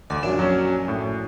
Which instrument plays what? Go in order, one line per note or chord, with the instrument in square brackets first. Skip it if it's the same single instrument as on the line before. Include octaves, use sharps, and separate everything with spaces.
[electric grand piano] D2 [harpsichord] D5
[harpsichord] A#1 F#2 D4 [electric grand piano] E7
[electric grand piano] F#3 C#4
A2